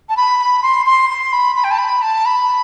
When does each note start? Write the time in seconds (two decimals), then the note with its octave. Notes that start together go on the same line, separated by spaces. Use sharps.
0.09 A5
0.17 B5
0.40 B5
0.63 C6
0.86 C6
1.10 C6
1.32 B5
1.56 B5
1.64 G5
1.71 A5
1.78 B5
2.02 A5
2.25 B5